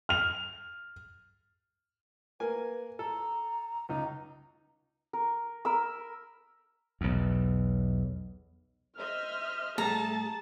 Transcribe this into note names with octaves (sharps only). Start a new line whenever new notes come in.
F6 F7
A#3 B4 G#5
A4 A#5
C#2 D#4 A#5
A#4
A#4 B5 E6
B1 E2
C5 D#5 E5 F6
A2 G3 A3 G#4 A4 A5 A#5